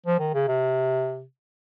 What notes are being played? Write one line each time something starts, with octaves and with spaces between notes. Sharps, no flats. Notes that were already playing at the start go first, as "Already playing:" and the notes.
F3
D#3
C#3
C3